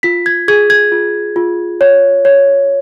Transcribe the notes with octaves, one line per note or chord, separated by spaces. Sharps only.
F4 B6
G#6
G#4 G#6
G#6
F4
F4
C#5
C#5